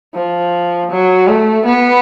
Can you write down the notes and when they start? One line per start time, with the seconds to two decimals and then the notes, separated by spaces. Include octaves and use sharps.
0.15 F3
0.91 F#3
1.28 A3
1.66 B3